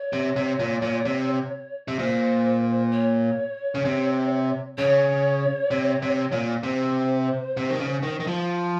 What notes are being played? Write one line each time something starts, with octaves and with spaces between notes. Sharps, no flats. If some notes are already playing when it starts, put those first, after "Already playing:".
Already playing: C#5
C3
C3
A#2
A#2
C3
C3
A#2 C5
C#5
C#3
C3
C#3 C#5
C3
C3
A#2
C3 C5
C3
D#3
C#3
D#3
D#3
F3